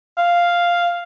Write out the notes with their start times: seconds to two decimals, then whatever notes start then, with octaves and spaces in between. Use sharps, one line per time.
0.18 F5